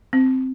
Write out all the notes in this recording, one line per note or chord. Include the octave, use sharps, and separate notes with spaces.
C4